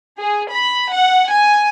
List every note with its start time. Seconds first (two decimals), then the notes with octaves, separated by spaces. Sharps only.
0.19 G#4
0.52 B5
0.91 F#5
1.29 G#5